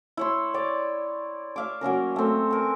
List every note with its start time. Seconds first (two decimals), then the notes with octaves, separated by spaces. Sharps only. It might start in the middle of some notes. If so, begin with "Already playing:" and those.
0.17 E4 C#5 C6
0.54 C#5 D5 G5
1.56 E5 F5 D6
1.81 F#3 A#3 C#4 A#4
2.16 A3 C4
2.51 A#4 G#5